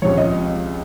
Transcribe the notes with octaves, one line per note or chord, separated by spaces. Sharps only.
C#2 C3 F3 C#5
D#5